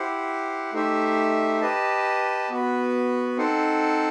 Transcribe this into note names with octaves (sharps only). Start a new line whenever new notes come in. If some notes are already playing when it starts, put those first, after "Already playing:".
Already playing: E4 G4 C5 F#5
A3 D#4 G4 C5 E5
G4 B4 D#5 A5
B3 F#4 B4
C4 D#4 A4 C5 F#5